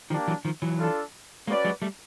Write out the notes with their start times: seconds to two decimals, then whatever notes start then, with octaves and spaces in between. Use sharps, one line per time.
0.10 D#3 F3 A#3 D4 G4
0.28 E3 F#3
0.45 D#3 F3
0.62 E3 F#3
0.79 D4 F4 A4
1.47 G#3 A#3 C#4 F#4 B4 D5
1.65 F#3 G#3
1.82 G3 A3